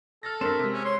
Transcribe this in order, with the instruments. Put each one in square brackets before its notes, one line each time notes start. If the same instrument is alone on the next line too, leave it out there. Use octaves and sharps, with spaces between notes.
[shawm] A4 [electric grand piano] F6 A6 A#6
[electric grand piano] G2 D4 E7 [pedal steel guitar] C4 E5 [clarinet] A#4
[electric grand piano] C3 G#3
[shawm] C#4
[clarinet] C#5 [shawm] C6